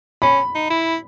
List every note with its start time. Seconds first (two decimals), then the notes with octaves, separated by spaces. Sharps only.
0.22 C#4 B5
0.55 D#4
0.70 E4